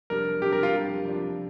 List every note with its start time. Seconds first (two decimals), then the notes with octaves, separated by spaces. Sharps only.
0.10 F2 C3 G3 D4 A#4
0.42 F2 C3 G3 D4 G4
0.52 A#4
0.63 F4
0.73 F2 C3 G3 D4
1.05 F2 C3 G3 D4